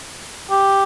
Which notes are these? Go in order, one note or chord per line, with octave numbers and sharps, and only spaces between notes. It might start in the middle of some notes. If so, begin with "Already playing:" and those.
G4